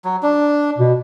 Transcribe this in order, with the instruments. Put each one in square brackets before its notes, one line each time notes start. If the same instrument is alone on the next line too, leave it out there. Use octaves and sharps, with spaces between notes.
[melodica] F#3
D4
[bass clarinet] B2